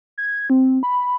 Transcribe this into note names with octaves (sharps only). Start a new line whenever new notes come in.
G#6
C4
B5